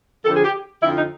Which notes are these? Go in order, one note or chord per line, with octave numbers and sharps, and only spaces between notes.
F2 D3 F3 A4
G#4
G4
F2 D3 F3 E4
D#4